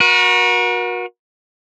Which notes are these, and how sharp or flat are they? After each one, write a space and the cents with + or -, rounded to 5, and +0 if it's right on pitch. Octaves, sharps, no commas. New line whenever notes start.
F#4 -25 A#4 +40